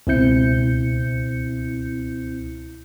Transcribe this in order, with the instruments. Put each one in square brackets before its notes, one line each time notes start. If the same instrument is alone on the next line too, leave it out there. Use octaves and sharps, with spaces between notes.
[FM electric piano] C#2 B2 C4 E4 G6 C#7